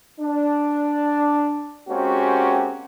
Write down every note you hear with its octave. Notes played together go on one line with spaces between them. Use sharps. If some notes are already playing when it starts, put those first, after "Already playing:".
D4
G#3 A#3 C4 C#4 F#4 G4